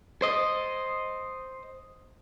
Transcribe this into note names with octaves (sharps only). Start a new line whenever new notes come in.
C5 D#5